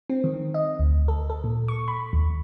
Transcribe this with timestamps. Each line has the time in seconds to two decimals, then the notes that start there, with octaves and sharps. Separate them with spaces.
0.10 C4
0.24 D#3
0.54 D#5
0.79 D2
1.08 A4
1.30 A4
1.44 A#2
1.68 C#6
1.88 B5
2.13 D#2